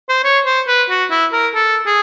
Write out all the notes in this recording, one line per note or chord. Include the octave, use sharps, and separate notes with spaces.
C5
C#5
C5
B4
F#4
E4
A#4
A4
G#4